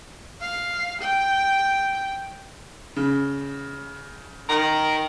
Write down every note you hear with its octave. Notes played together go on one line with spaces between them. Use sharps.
F5
G5
C#3
D#3 A#4